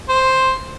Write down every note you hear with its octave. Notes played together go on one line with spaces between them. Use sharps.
C5